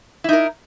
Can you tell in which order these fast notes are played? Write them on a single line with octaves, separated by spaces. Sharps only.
E4 D#4 A#4